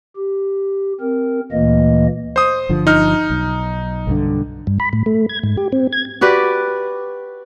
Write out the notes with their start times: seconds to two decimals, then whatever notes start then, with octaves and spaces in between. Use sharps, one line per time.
0.16 G4
1.01 C4 A#4
1.52 D2 A#2 E3 A#3 D#5
2.36 C5 D#6
2.69 G1 D3 F3
2.87 D#4 F6
3.30 B1
4.07 B1 G2 D3
4.67 G2
4.80 B5
4.93 A2
5.06 A3
5.29 G#6
5.43 G#2
5.57 G4
5.72 C4
5.92 G#6
6.21 F#4 G4 B4 D5